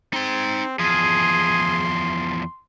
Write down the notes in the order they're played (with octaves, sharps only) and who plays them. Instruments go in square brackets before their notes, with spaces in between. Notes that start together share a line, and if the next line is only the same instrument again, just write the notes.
[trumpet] C4 [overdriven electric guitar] D#4 C6
[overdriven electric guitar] E2 F3 [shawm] G#4 [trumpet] C6